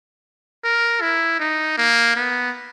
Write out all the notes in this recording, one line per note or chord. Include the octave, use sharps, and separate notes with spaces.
A#4
E4
D#4
A#3
B3